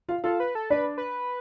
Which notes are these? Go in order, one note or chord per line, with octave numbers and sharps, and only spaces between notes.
F4 F5
F4 A4 F5
B4
A4
D4 B4 D5
B4